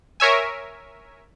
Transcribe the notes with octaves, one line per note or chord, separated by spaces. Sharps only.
A#4 C#5 E5 G#5